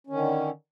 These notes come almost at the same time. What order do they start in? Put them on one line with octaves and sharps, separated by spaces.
C#4 D#3 D3